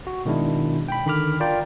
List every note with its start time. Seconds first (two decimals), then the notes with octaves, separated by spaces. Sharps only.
0.07 F#4
0.25 B2 D#3 G#3 D4 E4
0.88 G5 B5
1.06 D3 D#3 B5 D6 F6
1.40 F4 A#4 D5 G5